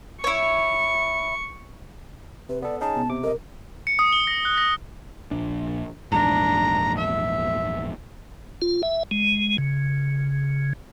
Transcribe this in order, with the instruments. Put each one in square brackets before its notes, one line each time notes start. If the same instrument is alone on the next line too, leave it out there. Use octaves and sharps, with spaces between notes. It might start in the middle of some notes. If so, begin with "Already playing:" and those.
[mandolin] E4 C#5 [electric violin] C#6
[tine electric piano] C3 [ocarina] B4
[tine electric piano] B3 A4 [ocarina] D5
[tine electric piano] C#4 D#4 G#4 [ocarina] A5
[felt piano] B2
[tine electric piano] C3 D6
[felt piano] A#4 [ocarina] D#5
[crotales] C#7
D#6
G7
A#6
F#6
A#6
[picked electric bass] A#1 D4
[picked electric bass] A#1 E2 G#2 [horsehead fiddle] D4 A#5
[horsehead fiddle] E5
[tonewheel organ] F4
E5
G#3
C#3